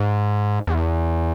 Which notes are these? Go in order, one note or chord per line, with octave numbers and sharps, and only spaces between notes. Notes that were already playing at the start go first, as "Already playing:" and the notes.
Already playing: G#2
E2